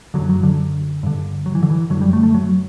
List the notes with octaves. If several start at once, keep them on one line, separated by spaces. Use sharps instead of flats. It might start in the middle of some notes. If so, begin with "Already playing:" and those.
F#2 D3 F#3
F#3
D3
G2 D3
F#3
E3
D3
E3
F#2 D3 F#3
G3
A3
A3
F#3